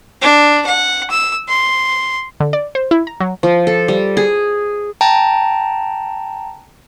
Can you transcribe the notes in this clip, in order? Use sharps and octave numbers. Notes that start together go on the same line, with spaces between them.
D4
F#5
E6
C6
D3
D5
C5
E4
A#5
F#3
F3
A4
G3
G#4
G5 A5 A#5